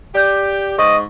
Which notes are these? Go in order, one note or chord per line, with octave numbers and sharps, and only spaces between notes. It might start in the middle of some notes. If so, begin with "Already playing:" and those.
G4 D5 G6
G#2 D#5 C#6